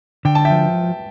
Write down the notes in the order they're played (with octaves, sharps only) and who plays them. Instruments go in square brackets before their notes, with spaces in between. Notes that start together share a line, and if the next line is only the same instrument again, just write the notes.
[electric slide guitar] D3 [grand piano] G5
[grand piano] A5
E5 G5
[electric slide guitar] F3